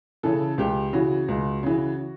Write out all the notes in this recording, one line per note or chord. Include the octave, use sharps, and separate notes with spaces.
C#3 E3 A4
C#2 G4
C#3 E3 F#4
C#2
C#3 E3